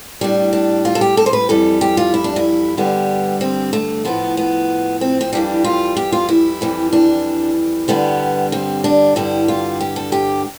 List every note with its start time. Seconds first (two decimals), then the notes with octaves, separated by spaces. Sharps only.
0.21 A2 G3 D4
0.53 D4
0.85 F4
0.95 A4
1.01 G4
1.17 A4
1.26 C5
1.33 B4
1.49 F2 E3 G3 A4
1.81 G4
1.97 F4
2.14 E4
2.24 D4
2.36 E4
2.77 G2 D3 G3 B3
3.41 C4
3.73 A3
4.05 A2 F3 B3
4.37 B3
5.01 C4
5.21 C4
5.33 F2 E3 G3 D4
5.64 F4
5.97 G4
6.12 F4
6.29 E4
6.61 F2 E3 G3
6.93 D4
7.88 G2 D3 G3 B3
8.52 C4
8.84 D4
9.16 G2 D3 G3 E4
9.48 F4
9.81 G4
9.96 A4
10.12 G4